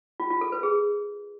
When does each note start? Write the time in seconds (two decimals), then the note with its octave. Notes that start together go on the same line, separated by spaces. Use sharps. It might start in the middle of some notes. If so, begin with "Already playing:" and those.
0.20 F4
0.30 F4
0.41 A4
0.52 B4
0.63 G#4